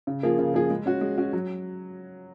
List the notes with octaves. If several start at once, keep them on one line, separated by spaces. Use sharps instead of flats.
C#3
F3 A#3 F4 G#4
C#3
F3 A#3 F4 G#4
G#3
C#4 F#4
G#3
C#4 F#4
F#3